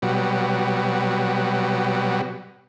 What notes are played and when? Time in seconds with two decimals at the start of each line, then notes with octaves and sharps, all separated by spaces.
0.02 B2 F#3 G3